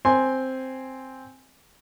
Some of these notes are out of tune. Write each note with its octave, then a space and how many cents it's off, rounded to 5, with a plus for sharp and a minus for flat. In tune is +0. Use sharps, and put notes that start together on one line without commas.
C4 +0 G#5 +0 C6 +0